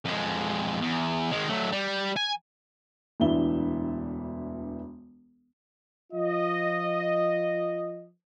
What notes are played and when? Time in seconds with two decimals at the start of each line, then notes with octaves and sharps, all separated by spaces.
0.05 F2 G#3
0.81 E2
1.31 D#3 G#3
1.49 F#3 A3
1.72 G3
2.16 G#5
3.20 E1 D2 E3 D4 E5 G7
6.13 F3 F4 D#5